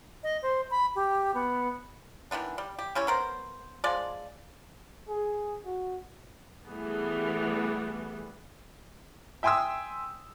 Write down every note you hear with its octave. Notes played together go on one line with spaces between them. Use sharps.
D#5
C5
B5
G4
B3
D#3 E3 B3 D4
G3
G4
G3 C#4 E4 C#5
B3 A#4 C5
F3 G#3 D5
G#4
F#4
E3 G3 A3 B3 G#4
E5 G5 G#5 C6 D#6 E6